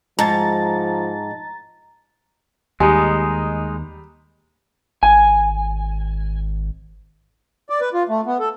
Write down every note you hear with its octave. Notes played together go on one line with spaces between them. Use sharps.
G#2 F3 A5 A#5 A6
D#2 G3 G#3 D#4 G#5
G#1 G#5
D5
B4
F4
A3
B3
A4